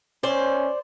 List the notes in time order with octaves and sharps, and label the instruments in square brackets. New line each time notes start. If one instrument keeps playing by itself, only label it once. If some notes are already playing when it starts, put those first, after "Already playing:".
[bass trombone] C#4 [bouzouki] C5 D5